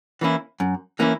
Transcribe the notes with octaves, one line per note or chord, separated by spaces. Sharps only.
E3 A#3 C#4 E4
F#2
E3 A#3 C#4 E4